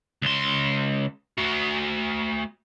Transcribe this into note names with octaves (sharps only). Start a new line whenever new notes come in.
C#2 C6
A3 F#4